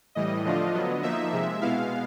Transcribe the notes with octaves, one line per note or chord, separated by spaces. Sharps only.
A2 E3 G3 D#5
D3 F3 A3 D4 F4 D#5
D3 F#3 B3
F3 A#3 D#4 E5
C3 F3 G#3
B2 G#3 B3 E4 F5